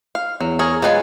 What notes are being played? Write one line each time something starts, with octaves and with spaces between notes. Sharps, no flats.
F5
E2 F#3
G#4 A#4 C#5
F#3 G#3 F4 B4 G#5